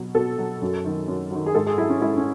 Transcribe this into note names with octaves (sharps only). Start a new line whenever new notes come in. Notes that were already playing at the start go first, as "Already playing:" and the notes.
Already playing: B2 F#3
B2 A4
F#3
F#2
D#3 F#3
F#2
D#3 F#3
G#4
G#2 A4
G#4
F#3 E4
C#4
G#2 E4
C#4